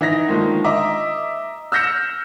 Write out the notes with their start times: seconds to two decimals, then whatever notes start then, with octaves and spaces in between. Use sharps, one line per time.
0.01 E3 D#4 A#6
0.27 D3 D#3 F3 G#3 A#3
0.64 D#5 E5 A#5 D6
1.72 E6 F6 G6 A#6 C#7 E7